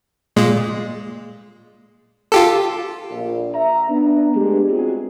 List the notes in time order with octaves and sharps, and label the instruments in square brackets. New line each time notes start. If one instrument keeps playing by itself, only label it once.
[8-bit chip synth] A#2 G#3
F4 G4 A4
[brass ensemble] A#1
E5 A#5
B3 D4
G#3 A3 B3 D4 G4
C4 F4 F#4 G#4